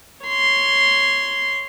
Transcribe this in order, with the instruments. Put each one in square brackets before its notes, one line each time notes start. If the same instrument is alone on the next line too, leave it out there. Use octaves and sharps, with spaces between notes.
[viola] C#5 C6